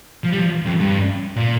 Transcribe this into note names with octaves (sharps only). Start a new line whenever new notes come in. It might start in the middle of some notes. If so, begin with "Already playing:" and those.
F3
G3
F3
F2
G2
A#2